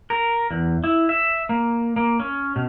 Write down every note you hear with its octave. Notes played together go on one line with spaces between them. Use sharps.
A#4
E2
E4
E5
A#3
A#3
C#4
B2